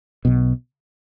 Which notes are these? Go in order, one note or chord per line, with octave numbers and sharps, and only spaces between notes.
B1 B2